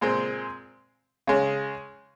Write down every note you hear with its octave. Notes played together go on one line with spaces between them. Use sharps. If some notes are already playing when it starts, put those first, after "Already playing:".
A#2 G#3 C4
C#3 G#3 C#4